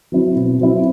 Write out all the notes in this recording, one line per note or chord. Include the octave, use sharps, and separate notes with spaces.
F#3 C4 E4
B2
F#3 C4 E4